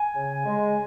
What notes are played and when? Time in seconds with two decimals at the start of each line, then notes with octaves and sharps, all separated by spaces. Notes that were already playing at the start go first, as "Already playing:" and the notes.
Already playing: G#5
0.16 C#3
0.46 G#3